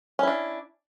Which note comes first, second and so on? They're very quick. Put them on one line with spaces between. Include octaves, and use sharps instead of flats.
C#4 E4 D4